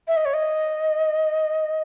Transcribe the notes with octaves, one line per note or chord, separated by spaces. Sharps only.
E5
D#5
C#5
D#5